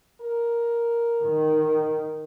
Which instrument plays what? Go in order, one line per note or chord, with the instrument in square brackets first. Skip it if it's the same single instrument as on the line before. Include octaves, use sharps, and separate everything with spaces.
[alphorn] A#4
[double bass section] D#3